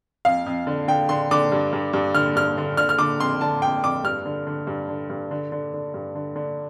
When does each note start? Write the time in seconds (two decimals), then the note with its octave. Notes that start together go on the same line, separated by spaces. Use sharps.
0.25 F2 F5
0.46 F2
0.67 D3
0.88 D3 G5
1.09 D3 C6
1.31 D3 D6
1.52 G2
1.73 G2
1.93 G2
2.14 D3 F6
2.35 G2 F6
2.58 D3
2.77 D3 F6
2.89 F6
2.99 D3 D6
3.20 F2 C6
3.41 D3 A5
3.62 F2 G5
3.84 F2 D6
4.04 G2 F6
4.25 D3
4.47 D3
4.67 G2
4.89 D3
5.10 G2
5.31 D3
5.52 D3
5.74 D3
5.94 G2
6.15 D3
6.36 D3